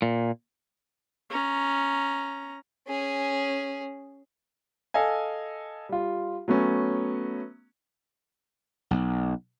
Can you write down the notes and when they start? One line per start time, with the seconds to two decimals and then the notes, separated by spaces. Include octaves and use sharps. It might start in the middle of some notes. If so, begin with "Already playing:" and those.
0.02 A#2
1.30 C#4 A#5
2.87 C#4 G#4
4.94 A4 D#5 F5 G#5
5.89 G3 F4
6.48 F#3 A3 B3 C#4
8.91 B1